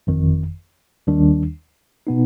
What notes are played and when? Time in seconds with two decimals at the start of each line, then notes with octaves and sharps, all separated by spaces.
0.07 G1 F2 D#3
1.07 D#2 D#3 G3 D4
2.07 B2 B3 D#4